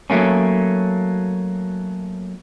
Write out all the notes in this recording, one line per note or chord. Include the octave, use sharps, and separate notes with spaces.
F#3 A3 A#3 C#4